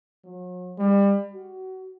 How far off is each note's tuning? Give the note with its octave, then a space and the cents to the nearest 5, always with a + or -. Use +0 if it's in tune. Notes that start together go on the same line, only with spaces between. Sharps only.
F#3 -40
G3 +30
F#4 +25